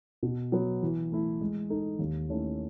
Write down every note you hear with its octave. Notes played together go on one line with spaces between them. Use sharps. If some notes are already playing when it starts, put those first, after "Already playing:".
B2
F#3 B3
E3
A3 E4
G#3
D#4 A4
D#2
D#3 A3 C#4 E4